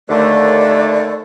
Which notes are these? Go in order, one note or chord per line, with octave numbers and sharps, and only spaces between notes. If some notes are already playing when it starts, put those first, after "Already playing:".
D#2 D3 A3 D5